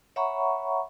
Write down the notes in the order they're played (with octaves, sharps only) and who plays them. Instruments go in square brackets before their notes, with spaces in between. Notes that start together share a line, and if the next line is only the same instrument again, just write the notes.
[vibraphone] C#5 E5 F#5 A#5 B5 C#6